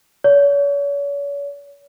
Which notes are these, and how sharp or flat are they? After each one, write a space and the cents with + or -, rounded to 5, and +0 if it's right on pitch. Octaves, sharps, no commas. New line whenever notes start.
C#5 +40